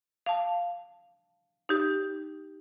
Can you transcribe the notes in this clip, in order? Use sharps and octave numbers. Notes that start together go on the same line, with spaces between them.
F5 A5
D#4 G4